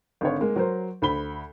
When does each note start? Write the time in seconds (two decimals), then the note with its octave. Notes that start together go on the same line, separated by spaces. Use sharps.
0.21 G#1 D3 C#5
0.41 G#3 A#3
0.56 F#3 A#4 C5
1.02 D2 C5 B5 G7